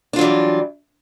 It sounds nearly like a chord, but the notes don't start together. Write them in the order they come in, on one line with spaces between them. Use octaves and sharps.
D4 F4 F#3 E3 G3